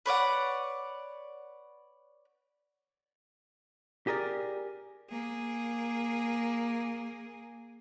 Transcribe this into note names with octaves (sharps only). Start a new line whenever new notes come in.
B4 C#5 D5 F#5
G4 G#4 A#4 D5
A#3 G#4